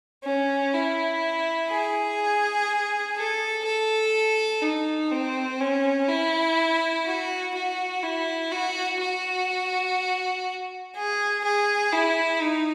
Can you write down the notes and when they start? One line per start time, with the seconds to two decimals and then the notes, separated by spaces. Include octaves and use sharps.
0.24 C#4
0.74 E4
1.70 G#4
3.17 A4
3.65 A4
4.62 D#4
5.11 C4
5.60 C#4
6.09 E4
7.06 F#4
7.55 F#4
8.04 E4
8.52 F#4
9.01 F#4
10.96 G#4
11.44 G#4
11.93 E4
12.42 D#4